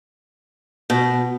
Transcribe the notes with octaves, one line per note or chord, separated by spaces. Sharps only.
B2